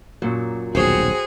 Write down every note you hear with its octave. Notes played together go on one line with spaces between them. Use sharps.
F#2 A#2 F#3
D#1 B1 F#4 G#4 C5 C#5 G5